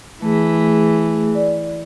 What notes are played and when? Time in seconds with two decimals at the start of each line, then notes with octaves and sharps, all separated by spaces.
0.22 E3 A3 G#4
1.35 D5